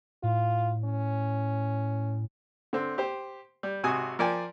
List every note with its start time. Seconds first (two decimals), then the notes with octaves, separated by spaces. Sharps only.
0.23 A2 F4
0.84 C#4
2.73 D3 C4
2.98 G4 C5
3.63 G3
3.84 G#1 C3 F#4 G#5 D#6
4.19 F3 A#4 D5 G5 G#5